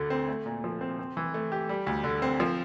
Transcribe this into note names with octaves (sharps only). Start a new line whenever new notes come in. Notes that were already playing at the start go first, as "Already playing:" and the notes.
Already playing: D2 D3 A3
C4
A3
A#2
F3
C4
C4
E3
A3
G4
G3
D2
D3
C4
F3